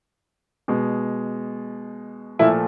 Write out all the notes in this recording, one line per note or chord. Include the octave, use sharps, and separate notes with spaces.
B2 G#3
A#2 F3 A3 E4 E5